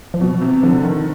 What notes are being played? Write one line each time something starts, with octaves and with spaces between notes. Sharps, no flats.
F3
B2 F#3
C3
D3 F3
D#3